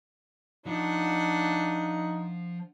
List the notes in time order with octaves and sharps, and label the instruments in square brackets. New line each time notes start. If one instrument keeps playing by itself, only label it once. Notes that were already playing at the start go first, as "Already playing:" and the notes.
[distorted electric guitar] F3 [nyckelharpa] D4 F#5 [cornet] D#4